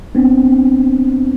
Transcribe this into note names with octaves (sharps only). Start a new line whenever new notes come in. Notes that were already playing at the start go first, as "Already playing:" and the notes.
B3 C4 D4